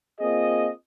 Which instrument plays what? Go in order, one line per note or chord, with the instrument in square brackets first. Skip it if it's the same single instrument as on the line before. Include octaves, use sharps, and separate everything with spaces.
[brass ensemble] A#3 C4 F4 G#4 D#5